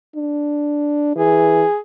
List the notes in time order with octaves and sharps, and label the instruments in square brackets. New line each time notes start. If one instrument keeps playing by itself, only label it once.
[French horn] D4
[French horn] E3 [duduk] G#4